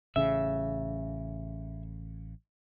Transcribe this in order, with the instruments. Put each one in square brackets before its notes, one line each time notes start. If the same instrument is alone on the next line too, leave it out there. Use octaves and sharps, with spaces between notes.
[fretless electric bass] A1 C#3 [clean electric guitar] E5